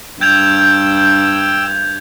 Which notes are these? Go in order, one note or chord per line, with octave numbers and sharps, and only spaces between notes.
G2 G5 E6 G6 G#6 F7